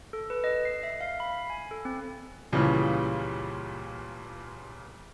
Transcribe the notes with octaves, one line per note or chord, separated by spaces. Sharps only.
A4
B4
D#5
C7
E5
F5
B5
G#5
A4
C4
C#2 A#2 C#3 E3 F3 G3